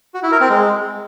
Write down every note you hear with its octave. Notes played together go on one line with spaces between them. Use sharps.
F#4
E4
A#4
C4
G#3